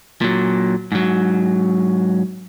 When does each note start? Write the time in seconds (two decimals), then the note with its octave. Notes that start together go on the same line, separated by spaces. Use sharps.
0.21 A#2 F#3
0.92 G#2 F#3